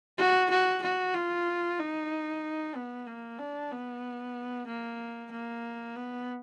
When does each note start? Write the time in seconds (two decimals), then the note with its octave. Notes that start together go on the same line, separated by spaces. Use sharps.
0.18 F#4
0.50 F#4
0.82 F#4
1.15 F4
1.79 D#4
2.75 B3
3.07 A#3
3.39 D4
3.71 B3
4.67 A#3
5.32 A#3
5.96 B3